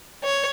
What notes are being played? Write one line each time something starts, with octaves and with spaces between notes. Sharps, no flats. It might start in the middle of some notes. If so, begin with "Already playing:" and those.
C#5